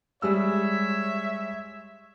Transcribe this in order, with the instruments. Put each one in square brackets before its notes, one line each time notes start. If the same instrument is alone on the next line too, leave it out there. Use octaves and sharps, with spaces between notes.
[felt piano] G3 G#3 E6 [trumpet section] C#5 E5